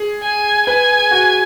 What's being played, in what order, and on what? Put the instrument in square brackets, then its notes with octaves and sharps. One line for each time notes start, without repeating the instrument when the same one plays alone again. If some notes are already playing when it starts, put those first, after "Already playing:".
Already playing: [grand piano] G#4
[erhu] G#5
[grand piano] B4 [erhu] G#5
[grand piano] F#4